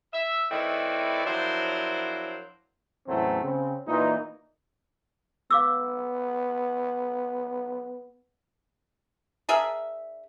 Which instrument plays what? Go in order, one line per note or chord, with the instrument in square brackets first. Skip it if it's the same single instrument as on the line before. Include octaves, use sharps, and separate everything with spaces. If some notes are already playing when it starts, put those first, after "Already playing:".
[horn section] E5
D#3 A3 C4 E4 B4 D5
F3 F#3 D4 E4 A#4 C5
[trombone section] E2 A2 F#3 A3 C4 C#4
C#3 C4
A#2 E3 D#4
[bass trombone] B3 [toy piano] F5 D6 E6
[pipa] D4 G#4 A#4 E5